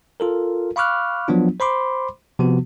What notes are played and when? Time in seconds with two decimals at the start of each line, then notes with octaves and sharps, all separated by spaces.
0.20 F4 A4 A#4
0.76 F5 B5 C#6 D6 F6 F#6
1.28 F3 F#3 B3 D4 F4
1.60 C5 B5 C6 D6
2.39 C3 F3 B3 F#4